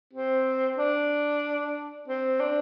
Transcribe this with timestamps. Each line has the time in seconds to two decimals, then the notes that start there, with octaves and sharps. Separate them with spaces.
0.13 C4
0.78 D4
2.08 C4
2.40 D4